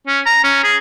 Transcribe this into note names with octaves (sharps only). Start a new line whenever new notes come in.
C#4
A#5
C#4
G#4